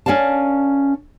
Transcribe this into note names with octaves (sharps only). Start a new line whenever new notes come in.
C#4 A#4 D5 F5 A5